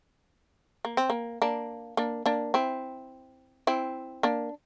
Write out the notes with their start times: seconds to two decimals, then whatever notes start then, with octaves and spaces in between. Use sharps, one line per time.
0.85 A#3
0.97 C4
1.10 A#3
1.42 A#3 D4
1.97 A#3 D4
2.26 A#3 D4
2.54 C4 E4
3.67 C4 E4
4.23 A#3 D4